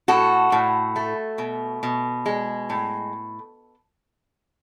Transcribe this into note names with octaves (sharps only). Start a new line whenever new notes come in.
A2 F#4 A4
A2
A3
B2
B2
G#3
A2